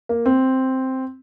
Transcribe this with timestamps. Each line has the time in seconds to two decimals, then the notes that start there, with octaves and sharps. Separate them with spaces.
0.09 A#3
0.26 C4